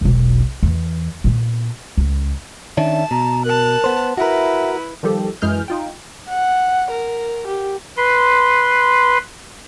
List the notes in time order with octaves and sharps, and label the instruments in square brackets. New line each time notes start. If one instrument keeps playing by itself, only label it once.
[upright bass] E1 B1
E2
A#2 B3
C#2
[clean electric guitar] D#3 C#4 D4 [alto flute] E5 [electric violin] A5
[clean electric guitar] B2 [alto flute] A#5
[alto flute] A#4 [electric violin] A5 F#6
[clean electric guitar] B3 C5
[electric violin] E4 B4 [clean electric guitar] F#4 A#4 [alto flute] E5
[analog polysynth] D#3 F3 G3 G4 A4
F#2 E3 G#3 G#4 F6 G6
D#4 F4 G5
[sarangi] F#5
A#4
G4
[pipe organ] B4 C6